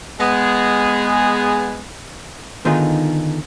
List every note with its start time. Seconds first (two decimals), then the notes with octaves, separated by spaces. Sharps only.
0.20 G#3 B3 G#4
2.65 D3 D#3 B3 D#4 F4 G#4